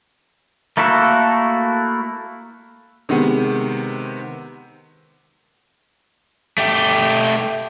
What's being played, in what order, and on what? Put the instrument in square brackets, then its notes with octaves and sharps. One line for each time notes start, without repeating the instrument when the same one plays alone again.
[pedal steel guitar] A3 A#3 E4 F#4 A4
[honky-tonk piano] C3 D#3 G#3 B3
[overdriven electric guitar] A3 G4